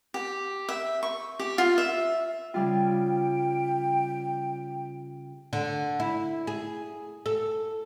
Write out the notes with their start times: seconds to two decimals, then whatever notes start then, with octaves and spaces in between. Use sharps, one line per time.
0.14 G4
0.69 E5
1.03 C#6
1.39 G4
1.58 F4
1.78 E5
2.54 C#3 G3 F4 G5
5.53 D3
6.00 E4
6.47 G#4
7.26 A4